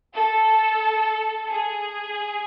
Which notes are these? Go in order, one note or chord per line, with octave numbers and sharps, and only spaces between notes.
A4
G#4